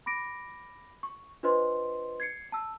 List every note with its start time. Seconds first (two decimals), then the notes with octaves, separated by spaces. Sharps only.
0.06 B5 D6 A#6 D7
1.03 C#6
1.43 D4 F4 B4 C5 D#5 C6
2.20 G#6 C7 C#7
2.52 A5 E6